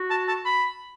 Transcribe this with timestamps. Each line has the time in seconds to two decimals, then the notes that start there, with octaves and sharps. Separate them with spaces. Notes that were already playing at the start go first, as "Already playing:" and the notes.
Already playing: F#4
0.10 A5
0.28 A5
0.45 B5